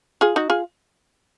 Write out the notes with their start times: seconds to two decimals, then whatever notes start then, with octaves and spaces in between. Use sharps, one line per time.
0.21 F4 G#4
0.36 D#4 F#4
0.50 F4 G#4